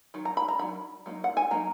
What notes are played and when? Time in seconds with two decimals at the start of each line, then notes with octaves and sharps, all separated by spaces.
0.14 D#3 F#3
0.25 A#5
0.37 B5
0.48 A#5
0.59 D#3 F#3 D4 B5
1.06 F#3 A#3 D#4
1.24 F#5
1.37 G#5
1.51 F#3 A#3 D#4 A#5